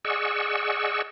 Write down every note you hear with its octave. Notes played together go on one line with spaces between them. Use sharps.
G#4 D5 D#5 F#5 C#6 E6